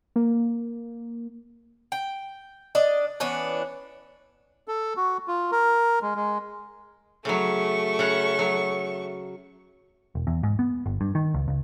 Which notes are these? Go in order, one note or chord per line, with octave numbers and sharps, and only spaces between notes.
A#3
G5
D4 D5 D#5
E3 B3 C#4 D4
A4
F#4
F4
A#4
G#3
G#3
C#3 F#3 A3 C#6
C#3 F#5
F#3
E1
E2
G#2
B3
G1
G2
D#3
C#2
C#2